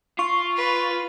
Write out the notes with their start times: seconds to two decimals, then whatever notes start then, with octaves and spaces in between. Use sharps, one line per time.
0.19 F4 C#6
0.56 B4